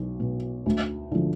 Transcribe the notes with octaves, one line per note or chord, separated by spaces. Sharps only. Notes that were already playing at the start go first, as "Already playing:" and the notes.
Already playing: B1
B2
D2
D3 F3